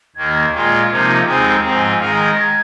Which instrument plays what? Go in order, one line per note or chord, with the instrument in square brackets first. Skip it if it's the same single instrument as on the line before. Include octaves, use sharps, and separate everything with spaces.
[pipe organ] D#2 D#3 A#3 [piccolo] G#6
[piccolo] G#6
[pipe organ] A#2 G#3 F4
C3 F3 A#3 D#4
[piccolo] G#6
[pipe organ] D#2 D#3 G#3 C4 G#4 [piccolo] F6
[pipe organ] G#2 F3 C4 [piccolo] A#5
[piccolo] G#5
G#5
[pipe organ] D#3 G#3 D#4 A#4 [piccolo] F5
[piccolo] A#5
G#6
A#6
G#6